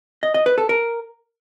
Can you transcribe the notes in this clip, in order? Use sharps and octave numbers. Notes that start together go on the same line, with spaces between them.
D#5
D#5
B4
A4
A#4